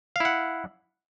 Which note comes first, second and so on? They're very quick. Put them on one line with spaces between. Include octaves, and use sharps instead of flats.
F5 E4 F#5